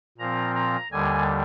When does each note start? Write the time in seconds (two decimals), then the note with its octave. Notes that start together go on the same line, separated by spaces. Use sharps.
0.18 A#2 F3 C4 A#5
0.55 A#5
0.91 D#2 D3 G3 G#5